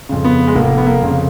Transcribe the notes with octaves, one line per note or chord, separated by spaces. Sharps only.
F2 C#3
B3
G#3
F1 A#3
B3
A#3
F2 C#3